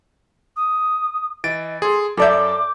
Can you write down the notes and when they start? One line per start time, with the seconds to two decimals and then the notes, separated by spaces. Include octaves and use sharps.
0.57 D#6
1.44 E3 D#5 A6 D7
1.82 G#4 A4 C6
2.17 F#2 A4 D5 E5 A5 D6 G6